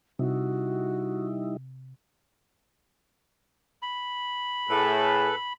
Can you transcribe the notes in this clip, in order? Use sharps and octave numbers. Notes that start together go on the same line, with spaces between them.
C3 G3 D#4 E4 F#4
B5
A2 G#4 A4 B4